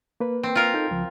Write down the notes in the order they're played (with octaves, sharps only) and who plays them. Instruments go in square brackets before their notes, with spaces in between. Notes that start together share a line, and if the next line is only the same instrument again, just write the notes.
[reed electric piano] A#3 B4
[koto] C4
F4 A#4
[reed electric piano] D#4 A4 G5
C#2 F3